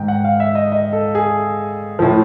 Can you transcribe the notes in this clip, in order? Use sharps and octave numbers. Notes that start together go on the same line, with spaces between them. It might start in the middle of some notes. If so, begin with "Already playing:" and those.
Already playing: G#2 D#3 G5
F#5
F5
E5
D#5
D#5
A4
G#4
A2 F3